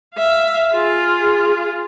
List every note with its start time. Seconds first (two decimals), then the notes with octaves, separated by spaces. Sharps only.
0.15 E5 F5
0.73 F4 G#4